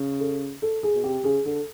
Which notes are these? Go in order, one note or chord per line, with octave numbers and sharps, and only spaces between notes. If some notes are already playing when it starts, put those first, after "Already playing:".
Already playing: C#3
A4
A4
G#4
B2
C3 G4
C#3 G#4
D3 A4